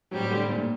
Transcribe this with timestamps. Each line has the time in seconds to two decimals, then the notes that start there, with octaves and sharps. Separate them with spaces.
0.11 A2 F#3 G3 C4 G4
0.31 D3
0.50 A#2